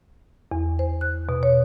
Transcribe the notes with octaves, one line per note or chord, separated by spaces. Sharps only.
E2
C5
F#6
B2
C#5